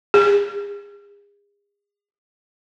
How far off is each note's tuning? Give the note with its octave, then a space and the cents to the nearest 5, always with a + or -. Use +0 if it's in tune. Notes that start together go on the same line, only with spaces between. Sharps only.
G#4 -35